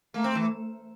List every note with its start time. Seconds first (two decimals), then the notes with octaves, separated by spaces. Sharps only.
0.14 A3 A#3
0.24 C4
0.35 E3